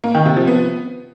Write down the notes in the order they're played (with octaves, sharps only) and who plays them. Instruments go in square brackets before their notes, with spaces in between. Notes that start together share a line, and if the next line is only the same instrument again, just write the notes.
[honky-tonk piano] A#3
D#3
C3
F3
B3